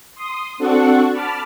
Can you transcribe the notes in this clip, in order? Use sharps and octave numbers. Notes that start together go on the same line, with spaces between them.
C6 D#6
C4 D4 F#4 A4 F#5 C#6
A5 B5 D6 F6